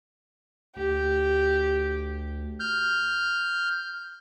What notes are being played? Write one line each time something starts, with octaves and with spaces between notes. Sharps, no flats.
D2 G4
F6 G6